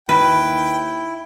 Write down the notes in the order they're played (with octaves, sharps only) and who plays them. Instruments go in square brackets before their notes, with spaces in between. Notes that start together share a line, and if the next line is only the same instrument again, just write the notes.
[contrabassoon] D#2 [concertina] E4 [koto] B4 [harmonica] G5